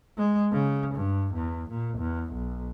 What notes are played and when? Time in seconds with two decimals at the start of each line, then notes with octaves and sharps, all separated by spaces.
0.18 G#3
0.52 C#3
0.95 G2
1.34 E2
1.70 A#2
1.99 E2
2.33 B1